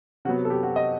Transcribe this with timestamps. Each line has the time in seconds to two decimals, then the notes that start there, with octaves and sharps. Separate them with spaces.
0.25 C3 F#3 B3 F#4
0.45 A4
0.50 G4
0.63 F#4
0.76 D#5